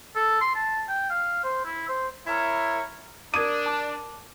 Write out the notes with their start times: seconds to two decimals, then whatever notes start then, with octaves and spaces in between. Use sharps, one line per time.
0.16 A4
0.41 C6
0.55 A5
0.88 G5
1.10 F5
1.44 C5
1.65 E4
1.89 C5
2.27 E4 A#4 C#5
3.34 D4 A#4 D6 D#6 G#6 D#7
3.66 A5 D6